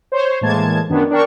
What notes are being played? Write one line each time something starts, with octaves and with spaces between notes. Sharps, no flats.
C5 C#5
A2 E3 G#3 A#3 A5 G#6
F#2 D#3 B3 D4
D4 A#4 G5 C#6